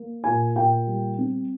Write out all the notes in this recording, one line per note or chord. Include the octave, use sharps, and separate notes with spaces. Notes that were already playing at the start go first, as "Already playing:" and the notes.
Already playing: A#3
A#2 G#5
A#2 G5
G3
C4